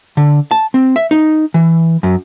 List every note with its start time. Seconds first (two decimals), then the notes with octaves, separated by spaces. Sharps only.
0.17 D3
0.51 A5
0.74 C4
0.96 E5
1.11 D#4
1.54 E3
2.03 F#2